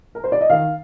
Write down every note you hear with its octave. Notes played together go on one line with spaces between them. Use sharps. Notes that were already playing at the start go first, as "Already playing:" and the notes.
A#4
C5
D5
D#5
D#3 F5